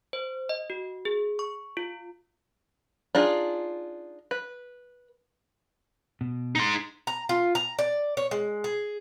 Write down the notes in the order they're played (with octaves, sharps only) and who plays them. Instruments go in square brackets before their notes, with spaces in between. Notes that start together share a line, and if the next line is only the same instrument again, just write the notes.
[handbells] C5
D#5
F#4
G#4
C#6
F4
[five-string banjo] D4 D#4 F4 G#4
B4
[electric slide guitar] B2
[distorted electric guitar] D#4 C6
[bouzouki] A#5
F4
A#5
D5
C#5
G#3
G#4